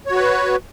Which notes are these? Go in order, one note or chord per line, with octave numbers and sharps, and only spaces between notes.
F#4 B4 C#5